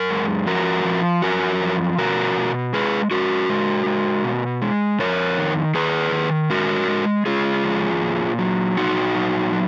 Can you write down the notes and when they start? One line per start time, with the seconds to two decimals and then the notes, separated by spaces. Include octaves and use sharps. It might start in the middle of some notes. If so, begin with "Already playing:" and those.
Already playing: F#2 A#4
0.10 G#3
0.47 F3 F#4 A#4
0.85 F3
1.22 F#2 F#4 A#4
1.60 F3
1.98 B2 F#4 A#4
2.36 B2
2.73 G#3 G#4 B4
3.11 G#3 F#4 A#4
3.49 G#3
3.86 G#3
4.24 B2
4.62 G#3
4.99 F2 A#4 C#5
5.38 D#3
5.74 D#3 G#4 B4
6.12 D#3
6.50 G#3 F#4 A#4
6.88 G#3
7.26 G#3 F4 G#4
7.64 F2
8.01 A#2
8.39 F#3
8.77 A#2 D#4 F#4
9.15 F#3
9.52 F#3